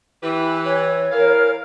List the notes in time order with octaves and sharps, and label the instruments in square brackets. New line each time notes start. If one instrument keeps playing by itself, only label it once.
[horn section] E3 [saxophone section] G4 B4
[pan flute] C#5
[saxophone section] E3 F5 [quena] A#4